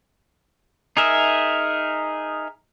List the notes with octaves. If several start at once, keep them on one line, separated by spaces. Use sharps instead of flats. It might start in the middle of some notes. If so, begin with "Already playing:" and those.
D#4 G#4 A#4 E5